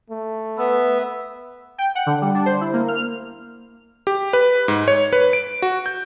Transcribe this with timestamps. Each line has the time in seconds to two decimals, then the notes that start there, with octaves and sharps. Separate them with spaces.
0.10 A3
0.58 B3 B4 E5
1.78 G5
1.95 F#5
2.06 D3
2.22 G3
2.35 D4
2.46 C5
2.61 E4
2.73 A#3
2.88 F6
4.07 G4
4.33 B4
4.68 G#2
4.88 C#5
5.13 B4
5.33 D7
5.62 F#4
5.86 G6